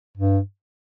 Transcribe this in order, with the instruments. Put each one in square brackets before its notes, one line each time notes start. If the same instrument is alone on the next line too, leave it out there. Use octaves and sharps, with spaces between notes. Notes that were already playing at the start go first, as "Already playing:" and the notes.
[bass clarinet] G2